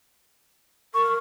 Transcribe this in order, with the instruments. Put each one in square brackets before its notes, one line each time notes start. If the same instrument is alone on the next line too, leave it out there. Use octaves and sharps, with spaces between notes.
[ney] A#4 [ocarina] C#6